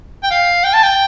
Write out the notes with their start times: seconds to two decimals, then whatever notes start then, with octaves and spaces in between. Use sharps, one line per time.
0.23 G5
0.31 F5
0.64 G5
0.73 A5
0.83 G5